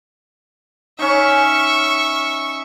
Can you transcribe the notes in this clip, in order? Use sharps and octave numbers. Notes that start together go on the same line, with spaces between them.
C#4 D#4 E5 C#6